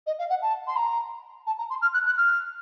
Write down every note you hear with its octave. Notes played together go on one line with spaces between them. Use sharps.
D#5
F5
F#5
A5
C6
A#5
A5
A#5
C6
F6
F#6
F#6
F6